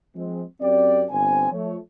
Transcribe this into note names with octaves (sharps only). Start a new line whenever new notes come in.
F3 G#3 C4
F#2 C4 G4 D5
G1 C4 G#5
F3 A3 C#5